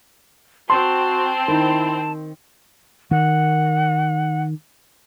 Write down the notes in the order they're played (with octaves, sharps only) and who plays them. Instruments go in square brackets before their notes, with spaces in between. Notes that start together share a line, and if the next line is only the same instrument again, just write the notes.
[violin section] C4 [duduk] F#4 [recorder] A5 [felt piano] C6
[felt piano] D#3 [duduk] E4
[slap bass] D#3 [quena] F#5